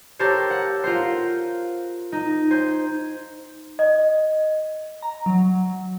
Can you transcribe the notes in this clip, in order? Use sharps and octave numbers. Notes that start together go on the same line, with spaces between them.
G4 A4 A#4 C5 C#5
F#5
F4 A#4 C5
D#4
C5 G#5
D#5
A#5
F#3